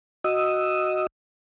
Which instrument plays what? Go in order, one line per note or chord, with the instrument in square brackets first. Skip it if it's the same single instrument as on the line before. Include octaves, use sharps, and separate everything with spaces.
[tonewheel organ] F#4 D#5 D#6 E6